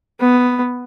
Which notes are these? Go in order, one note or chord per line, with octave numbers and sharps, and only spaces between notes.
B3